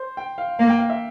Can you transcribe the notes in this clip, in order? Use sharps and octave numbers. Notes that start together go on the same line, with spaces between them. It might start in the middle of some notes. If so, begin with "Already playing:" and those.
Already playing: C5
G5
F5
A#3 F5
G5
F5
E5